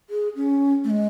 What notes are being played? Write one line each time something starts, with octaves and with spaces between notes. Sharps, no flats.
G#4
C#4
A3
G#3